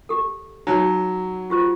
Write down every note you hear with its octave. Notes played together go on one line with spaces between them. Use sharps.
G4 A4
F#3 D#4 C#5
F4 G4 C5